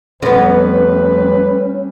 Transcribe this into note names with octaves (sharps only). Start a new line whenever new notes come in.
F2 F#3 G3 A3 B3 C#4 B4